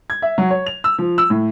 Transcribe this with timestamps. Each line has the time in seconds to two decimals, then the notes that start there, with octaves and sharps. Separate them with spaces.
0.10 G#6
0.22 E5
0.38 F#3
0.51 C#5
0.66 F7
0.84 E6
0.98 F3
1.18 E6
1.30 A2